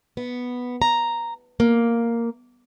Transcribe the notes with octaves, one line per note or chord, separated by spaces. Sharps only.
B3
A#5
A#3